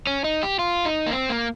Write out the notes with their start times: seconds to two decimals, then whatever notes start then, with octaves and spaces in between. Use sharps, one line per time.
0.07 C#4
0.24 D#4
0.43 G4
0.59 F4
0.85 D#4
1.07 A#3
1.12 C4
1.29 A#3